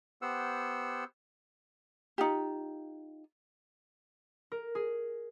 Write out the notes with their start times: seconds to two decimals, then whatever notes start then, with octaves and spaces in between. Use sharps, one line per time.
0.22 B3 G4 C5 F#5 E6
2.18 D#4 F4 G4
4.52 A#4
4.75 G#4